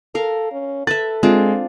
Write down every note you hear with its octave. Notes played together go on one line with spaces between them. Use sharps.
A4 A#4 F5
C#4
A4 B4 E5 A6
G#3 C4 D4 F4